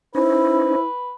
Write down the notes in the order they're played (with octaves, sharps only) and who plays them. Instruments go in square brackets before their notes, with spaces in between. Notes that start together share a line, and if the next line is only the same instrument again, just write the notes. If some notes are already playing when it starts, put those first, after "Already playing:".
[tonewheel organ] C#4 D#4 [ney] E4 [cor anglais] B4 [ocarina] C5